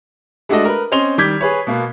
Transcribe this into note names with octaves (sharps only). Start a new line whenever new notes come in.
G#3 A3 D4 F#4 A4 D#5
A#4 B4
C4 C#4 D#5 C6 F7 G7
D#3 G3 D6 G6 G#6 B6
G#4 B4 C#5
B2 A#3 B3